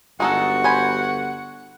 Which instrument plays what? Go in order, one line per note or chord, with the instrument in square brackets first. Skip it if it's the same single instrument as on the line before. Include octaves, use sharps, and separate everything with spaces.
[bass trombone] G1 [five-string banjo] G#3 D#4 A4 [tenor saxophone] F#4 [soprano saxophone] F#5
[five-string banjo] C5 G#5 B5